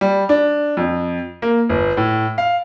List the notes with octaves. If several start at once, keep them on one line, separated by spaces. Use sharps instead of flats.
G3
D4
F2
A#3
G1
A2
F5